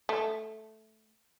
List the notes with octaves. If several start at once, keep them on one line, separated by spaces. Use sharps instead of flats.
A3